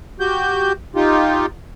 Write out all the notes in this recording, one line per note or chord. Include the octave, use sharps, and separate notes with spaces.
F#4 G4 G6
D#4 F4 G4